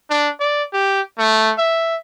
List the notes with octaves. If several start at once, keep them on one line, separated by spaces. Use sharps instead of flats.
D4
D5
G4
A3
E5